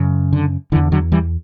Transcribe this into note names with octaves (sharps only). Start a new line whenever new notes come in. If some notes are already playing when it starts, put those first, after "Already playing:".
Already playing: F#2 C#3
D3
E2 D3 E3
D3 F#3
E3 G3